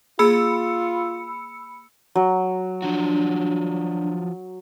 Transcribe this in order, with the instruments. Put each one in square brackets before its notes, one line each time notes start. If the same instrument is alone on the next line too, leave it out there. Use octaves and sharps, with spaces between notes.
[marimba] A#3 G#4 [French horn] F4 [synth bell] B5 E6 C#7
[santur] F#3
[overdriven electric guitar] F3 F#4 [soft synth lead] D4